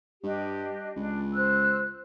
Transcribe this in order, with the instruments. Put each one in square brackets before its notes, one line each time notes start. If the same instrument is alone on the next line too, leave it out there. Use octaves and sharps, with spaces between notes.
[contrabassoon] G2 [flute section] D4 G4 D#5
[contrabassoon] C#2 [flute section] D4
[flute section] C5 E6 F#6